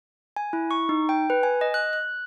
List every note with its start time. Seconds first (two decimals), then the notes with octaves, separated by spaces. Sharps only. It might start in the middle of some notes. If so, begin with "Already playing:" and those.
0.36 G#5
0.53 E4
0.71 C#6
0.89 D#4
1.09 G5
1.30 B4
1.43 G#5
1.61 D#5
1.74 F#6
1.93 F#6